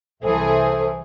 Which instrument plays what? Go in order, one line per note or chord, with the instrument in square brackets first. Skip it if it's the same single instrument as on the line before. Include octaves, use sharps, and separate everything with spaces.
[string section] C2 E3 G#4 [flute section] A4 C5 E5